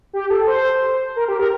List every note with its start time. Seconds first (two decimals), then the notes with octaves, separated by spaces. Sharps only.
0.13 G4
0.30 A4
0.47 C5
1.16 A#4
1.28 G4
1.39 A#4